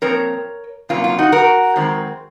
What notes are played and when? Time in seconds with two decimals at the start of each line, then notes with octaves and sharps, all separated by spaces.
0.02 A#2 F3 C4 A#4 C#5
0.89 F2 C3 F#3 A#3 C#4 F4
1.04 F4
1.19 D#4 F#4
1.32 F#4 A#4
1.76 F2 D#3 G#3 C4